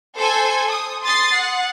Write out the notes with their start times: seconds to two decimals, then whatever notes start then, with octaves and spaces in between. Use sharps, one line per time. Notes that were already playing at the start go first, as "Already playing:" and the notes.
0.19 A4 C5 G#5
0.69 D#6
1.03 C6 D#6 A6 C7
1.36 F#5